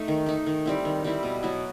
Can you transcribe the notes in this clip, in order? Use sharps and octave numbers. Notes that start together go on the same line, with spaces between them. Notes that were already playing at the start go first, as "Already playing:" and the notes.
Already playing: A3 D#4
D#3
A3 D#4
D#3
G3 C4 E4
D#3
G3 C4 E4
B2
F#3 B3 E4